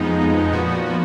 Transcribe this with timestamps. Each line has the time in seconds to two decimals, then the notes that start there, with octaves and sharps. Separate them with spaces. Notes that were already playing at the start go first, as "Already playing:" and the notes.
Already playing: F2 F3 G#3 B3 D#4
0.52 A#2 F3 B3 F#4